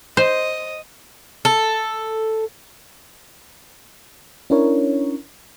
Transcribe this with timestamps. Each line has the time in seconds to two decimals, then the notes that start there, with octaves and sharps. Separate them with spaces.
0.17 C5 D#5
1.45 A4
4.50 C#4 D4 E4 A#4 C#5